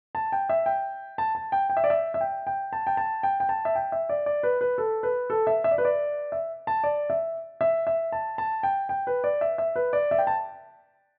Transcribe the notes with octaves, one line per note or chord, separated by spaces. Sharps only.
A5
G5
E5
G5
A5
A5
G5
G5
E5
D5
E5
E5
G5
G5
A5
G5
A5
G5
G5
A5
E5
G5
E5
D5
D5
B4
B4
A4
B4
A4
E5
E5
D5
B4
D5
E5
A5
D5
E5
E5
E5
A5
A5
G5
G5
B4
D5
E5
E5
B4
D5
E5
G5
A5